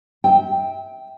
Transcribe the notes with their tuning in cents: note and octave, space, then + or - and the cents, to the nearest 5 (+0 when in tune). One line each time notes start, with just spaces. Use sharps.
E5 -25 G5 +0